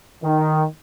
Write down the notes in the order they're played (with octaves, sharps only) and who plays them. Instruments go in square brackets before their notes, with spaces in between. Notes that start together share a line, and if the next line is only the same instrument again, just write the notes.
[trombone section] D#3